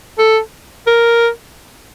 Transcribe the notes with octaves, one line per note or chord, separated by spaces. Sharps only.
A4
A#4